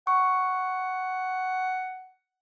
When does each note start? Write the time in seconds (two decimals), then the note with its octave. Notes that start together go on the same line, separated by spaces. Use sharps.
0.07 F#5 C#6